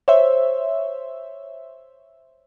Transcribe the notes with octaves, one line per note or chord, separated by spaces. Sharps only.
C5 C#5 E5